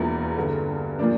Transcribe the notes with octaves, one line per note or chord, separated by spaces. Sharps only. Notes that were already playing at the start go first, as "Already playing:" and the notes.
Already playing: E1 E2 E3 A#3 F4
G2 D3 A3
A#2 F3 A#3 D4